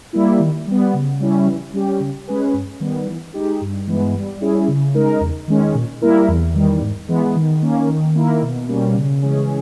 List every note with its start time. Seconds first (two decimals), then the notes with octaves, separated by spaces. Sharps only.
0.13 G3 A#3 E4
0.40 D#3
0.67 G3 B3
0.94 C#3
1.20 G3 C#4 E4
1.46 E3
1.73 G3 C#4 G4
2.00 C#3
2.28 G#3 C#4 G#4 B4
2.54 G2
2.80 D#3 G3 B3
3.07 E3
3.34 G#3 D#4 G4
3.61 G2
3.87 E3 G#3 B3
4.14 G3
4.41 C#4 E4 G#4
4.68 C#3
4.94 G#3 D#4 A#4
5.21 E2
5.48 D#3 G#3 C#4
5.74 A#2
6.02 G3 A#3 E4 A#4
6.28 E2
6.54 D#3 G3
6.81 G#2
7.08 E3 G#3 B3
7.35 D#3
7.62 A#3 C#4
7.89 D#3
8.15 A#3 E4 A#4
8.42 B2
8.68 G3 A#3 C#4
8.96 C#3
9.22 E3 G#3 C#4 G#4